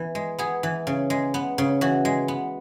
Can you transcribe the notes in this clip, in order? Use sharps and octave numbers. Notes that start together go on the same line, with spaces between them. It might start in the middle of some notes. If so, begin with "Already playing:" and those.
Already playing: E3 B3
G#3
B3 G#4
E3
C#3
G#3
B3
C#3
E3 F#4
G#3
B3